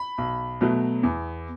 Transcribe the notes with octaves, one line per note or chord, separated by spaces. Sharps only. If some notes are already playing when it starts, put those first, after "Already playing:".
Already playing: B5
B1
B2 F#3 A3
E2